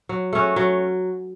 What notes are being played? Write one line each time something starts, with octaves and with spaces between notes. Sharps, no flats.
F#3
A3 C#4 F#4
F#3